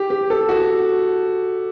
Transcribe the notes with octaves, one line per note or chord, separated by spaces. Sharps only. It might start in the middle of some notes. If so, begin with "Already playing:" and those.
Already playing: G4
G4
A4
F#4